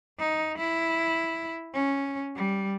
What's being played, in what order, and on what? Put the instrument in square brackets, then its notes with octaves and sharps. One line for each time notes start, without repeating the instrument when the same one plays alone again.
[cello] D#4
E4
C#4
G3